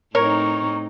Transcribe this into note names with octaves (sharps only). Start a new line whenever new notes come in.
A2 C4 D#4 A#4 C#5 C#6